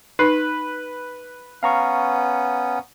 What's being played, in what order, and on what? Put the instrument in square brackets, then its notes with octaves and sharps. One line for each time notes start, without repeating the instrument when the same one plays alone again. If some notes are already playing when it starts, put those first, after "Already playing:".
[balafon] D#4 [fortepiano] B4
[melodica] B3 C#4 [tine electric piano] F5 A#5 C#6